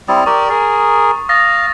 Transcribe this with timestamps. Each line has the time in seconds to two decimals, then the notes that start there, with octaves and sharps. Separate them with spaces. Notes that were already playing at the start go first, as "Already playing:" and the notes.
0.08 G3 C4 E4 D#6 A6
0.26 G4 A#4 D5 C#6
0.50 G#4 A#4
1.29 F5 D#6 A6 A#6